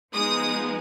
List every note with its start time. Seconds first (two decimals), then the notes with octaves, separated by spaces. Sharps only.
0.14 F3 G#3 B3 D#4 D#6